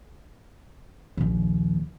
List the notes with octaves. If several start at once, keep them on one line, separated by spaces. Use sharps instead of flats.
A#1 D#2